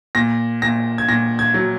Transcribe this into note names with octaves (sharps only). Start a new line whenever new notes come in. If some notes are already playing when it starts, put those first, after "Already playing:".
A#2 A#6
A#2 A#6
G#6
A#2 A#6
G#6
F#3